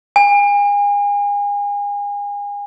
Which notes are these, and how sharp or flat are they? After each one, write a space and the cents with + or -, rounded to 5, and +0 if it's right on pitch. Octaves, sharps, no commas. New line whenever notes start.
G#5 -35